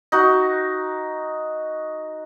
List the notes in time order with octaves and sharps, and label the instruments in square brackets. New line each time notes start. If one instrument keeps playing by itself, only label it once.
[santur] D#4 F#4